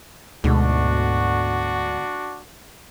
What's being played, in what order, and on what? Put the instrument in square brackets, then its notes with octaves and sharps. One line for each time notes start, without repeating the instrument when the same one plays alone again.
[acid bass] D2 [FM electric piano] G#2 [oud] B2 D3 [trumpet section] D4 F#4